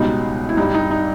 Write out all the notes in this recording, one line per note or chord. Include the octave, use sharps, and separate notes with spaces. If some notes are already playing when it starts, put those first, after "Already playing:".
Already playing: C#2 B2 G3 D#4
E4
G2 G3 D#4
D#4
D#4